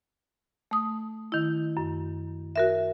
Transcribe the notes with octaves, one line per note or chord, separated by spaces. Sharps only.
A3 D#6
D#3 E4
F#2
F#4 A#4 E5